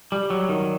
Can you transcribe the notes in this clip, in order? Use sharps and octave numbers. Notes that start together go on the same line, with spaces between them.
G3
F#3
D#3